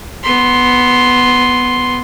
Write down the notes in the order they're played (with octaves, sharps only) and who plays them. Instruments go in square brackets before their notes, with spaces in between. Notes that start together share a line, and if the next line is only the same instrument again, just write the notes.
[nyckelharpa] B3 C6